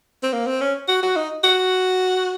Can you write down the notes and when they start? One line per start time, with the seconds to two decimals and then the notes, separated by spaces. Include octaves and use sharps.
0.23 C4
0.33 A#3
0.46 C4
0.61 C#4
0.88 F#4
1.03 F#4
1.16 D#4
1.44 F#4